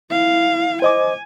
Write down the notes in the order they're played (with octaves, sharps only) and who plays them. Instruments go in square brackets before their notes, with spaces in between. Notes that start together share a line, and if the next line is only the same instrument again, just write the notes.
[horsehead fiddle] E4 F5
[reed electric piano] C5 D#5 D6 [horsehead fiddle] G#5